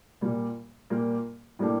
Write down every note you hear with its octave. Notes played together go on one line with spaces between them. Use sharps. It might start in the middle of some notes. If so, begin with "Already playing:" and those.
A#2 G3 A#3
A#2 G3 A#3
A2 G3 A#3 D4 G4